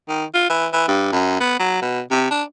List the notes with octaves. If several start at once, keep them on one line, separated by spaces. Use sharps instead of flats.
D#3
F4
E3
E3
G2
F#2
B3
F#3
B2
C3
D4